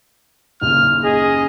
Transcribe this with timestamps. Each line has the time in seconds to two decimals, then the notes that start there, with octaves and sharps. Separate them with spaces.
0.62 F#1 D#2 C#3 F6
1.04 G#4 D#5